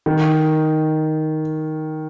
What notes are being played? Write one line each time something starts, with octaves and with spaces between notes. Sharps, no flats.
D#3